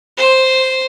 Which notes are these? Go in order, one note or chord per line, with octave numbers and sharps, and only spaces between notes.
C5